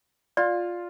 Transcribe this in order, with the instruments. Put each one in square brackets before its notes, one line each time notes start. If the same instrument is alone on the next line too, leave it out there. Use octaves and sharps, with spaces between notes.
[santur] F4 [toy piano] D5